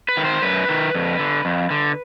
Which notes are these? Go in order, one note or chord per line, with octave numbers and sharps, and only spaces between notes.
B4
D#3
C5
F#2 B4
D#3
F2
D3
F2
D3